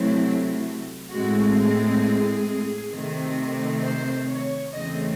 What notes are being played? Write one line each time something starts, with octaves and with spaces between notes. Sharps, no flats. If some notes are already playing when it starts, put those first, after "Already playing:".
Already playing: C3 F#3 A3 C4 E4
A2 G#3 C4 F#4
G#4
C3 D#3 A3 C4
C5
C#5
E2 C#3 E3 A3 C4 D#5